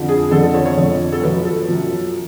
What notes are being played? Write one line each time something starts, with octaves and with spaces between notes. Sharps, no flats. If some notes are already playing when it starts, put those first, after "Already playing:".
Already playing: F2 D3 F3
G#4
F2 D3 F3 A4
A4
C#5
C#5
F2 D3 F3
A4
F#2 F3 B4
A4
F#2 F3